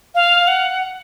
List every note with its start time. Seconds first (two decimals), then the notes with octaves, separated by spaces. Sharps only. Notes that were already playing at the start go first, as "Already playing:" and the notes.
0.15 F5
0.47 F#5